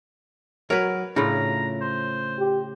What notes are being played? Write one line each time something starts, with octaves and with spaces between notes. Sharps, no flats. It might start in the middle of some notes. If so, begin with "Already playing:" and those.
F#3 A#4 B4 C#5
A2 C#3 D4 F4 A#5 B5
C5
G4